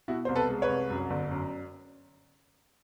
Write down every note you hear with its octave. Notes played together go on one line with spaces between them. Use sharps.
B2 E4 F#4
C2 C5
A4 B4
G#3
B4 C#5
C2
F#2
G1
F#2